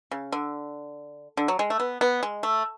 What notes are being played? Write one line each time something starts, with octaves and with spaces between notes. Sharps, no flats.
C#3
D3
D3
F#3
G#3
A3
B3
B3
G#3
A3